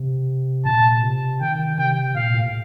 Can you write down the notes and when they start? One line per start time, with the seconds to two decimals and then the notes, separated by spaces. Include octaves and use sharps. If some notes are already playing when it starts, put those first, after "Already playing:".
Already playing: C3
0.65 A#2 A5
1.02 C3
1.41 D#3 G5
1.59 D#3
1.78 C3 G5
2.15 A#2 F5
2.34 A2